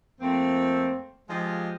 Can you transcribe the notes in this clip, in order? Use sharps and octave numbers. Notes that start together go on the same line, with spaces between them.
F2 A3 A#3 C4
F3 G#3 F4 G4 G#4 D#5